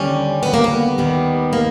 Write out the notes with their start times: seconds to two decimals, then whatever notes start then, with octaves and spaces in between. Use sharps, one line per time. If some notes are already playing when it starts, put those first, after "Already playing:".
Already playing: D#2 D3 G3 C#4
0.43 B3
0.54 A#3
0.64 B3
0.98 D#2 D#3 G3
1.53 A#3